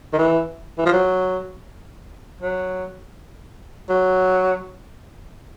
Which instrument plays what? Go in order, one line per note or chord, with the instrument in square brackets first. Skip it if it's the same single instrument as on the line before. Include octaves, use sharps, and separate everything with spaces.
[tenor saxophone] D#3
E3
E3
F3
F#3
F#3
F#3